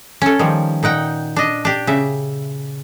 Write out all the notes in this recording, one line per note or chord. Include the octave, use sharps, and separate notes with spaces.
C#4 A4
D#3 F3 G3
A#2 D#4 F#5 G5
D4 D#5
D4 G4
C#3 E5